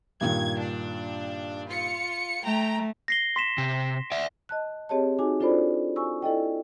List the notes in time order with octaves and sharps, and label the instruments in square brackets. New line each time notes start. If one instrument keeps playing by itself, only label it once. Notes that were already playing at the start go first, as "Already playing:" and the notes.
[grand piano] G2 A#2 D#3 [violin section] G#6
[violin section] D4
F4 C#7
[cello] A3 [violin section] G5 A#5
[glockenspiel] A#6 C7 G7
C6 B6 E7
[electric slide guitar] C3
D5 E5
[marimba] D#5 A5 F#6
C4 G4 G#4 C#5 D#5 A5
D#4 F#4 G#4 G#5 D6
D4 F4 A4 C5 D5 B5
G#5 C#6 E6
E4 A4 D5 D#5 G5